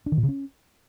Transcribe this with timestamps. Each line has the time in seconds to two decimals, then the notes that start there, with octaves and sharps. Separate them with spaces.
0.06 D4
0.12 D#3
0.18 A#2
0.23 C#3
0.29 C#4